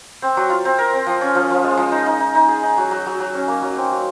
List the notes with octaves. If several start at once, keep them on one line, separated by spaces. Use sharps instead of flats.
C4
F#3
F4
C4
A#4
C4
F3
C#4
F3
F3
G#3
F3
D#4
D#4
D#4
D#4
G#4
D#4
F#3
F#3
F#3
F#3
C#4
A#3
F#3
C4
F#3